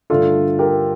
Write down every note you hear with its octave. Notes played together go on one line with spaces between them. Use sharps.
G2 D3 A3 D4 F4 A4
G4 A#4